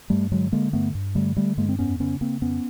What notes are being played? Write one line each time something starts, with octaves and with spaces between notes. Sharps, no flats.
G2 G3 A3
D3 F#3 G#3
D3 G#3 A#3
G2 A3 B3
G2
D3 G3 A3
D3 G3 A3
G2 G#3 A#3
C4
F2 B3 C#4
C#3 B3 C#4
C#3 A#3 C4
F2 B3 C#4